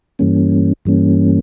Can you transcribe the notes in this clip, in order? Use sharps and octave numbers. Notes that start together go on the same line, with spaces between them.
G2 E3 G3 A#3 C#4
G2 E3 G3 A#3 C#4